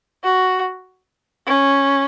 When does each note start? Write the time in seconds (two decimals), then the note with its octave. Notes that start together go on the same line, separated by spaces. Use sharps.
0.24 F#4
1.47 C#4